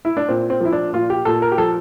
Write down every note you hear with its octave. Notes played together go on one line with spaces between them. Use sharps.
E4
D4
A#2 C4
C4
F3 E4
D4
A#2 F4
G4
A#2 A4
A#4
G4
F3 A4